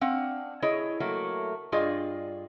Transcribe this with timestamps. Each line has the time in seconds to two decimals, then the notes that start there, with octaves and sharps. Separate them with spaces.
0.01 C4 D4 F5 F#5
0.62 E4 G#4 C#5 D#5
1.00 F#3 A3 A#3
1.72 G2 F4 G#4 D5 D#5